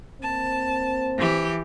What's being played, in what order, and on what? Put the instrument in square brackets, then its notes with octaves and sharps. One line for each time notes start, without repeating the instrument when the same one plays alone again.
[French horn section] A#3 C4 C5 [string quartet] A5
[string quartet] E3 G4